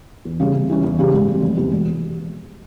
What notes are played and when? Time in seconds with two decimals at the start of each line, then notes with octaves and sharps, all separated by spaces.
0.25 E2
0.40 C#3 G3 C#4
0.55 C3
0.70 E3 G3 C#4
0.84 E2
0.99 C#3 G3 C#4 G4
1.14 G#2
1.28 G3 C4
1.42 F1
1.57 E2 C3
1.72 E1